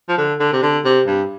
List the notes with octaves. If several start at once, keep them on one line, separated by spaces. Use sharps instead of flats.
F3
D3
D3
C3
D3
C3
G2